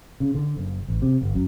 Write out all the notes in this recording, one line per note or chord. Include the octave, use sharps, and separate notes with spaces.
C#3
D3
F#1
A1
C3
G1
F#2